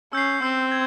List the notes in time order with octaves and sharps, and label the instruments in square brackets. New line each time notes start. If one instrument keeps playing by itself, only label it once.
[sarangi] C#4 [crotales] E6 G6 C7
[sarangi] C4 [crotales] E6 G6 C7
[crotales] G#6